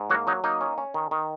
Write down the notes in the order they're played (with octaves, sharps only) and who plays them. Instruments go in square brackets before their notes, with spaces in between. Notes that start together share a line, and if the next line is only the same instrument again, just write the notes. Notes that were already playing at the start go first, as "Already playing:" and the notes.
Already playing: [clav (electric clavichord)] G#2
F#3 A#3 F#4
F#3 D#4
A#3 D#4 D#5
C#4
C#4
D#3
D#3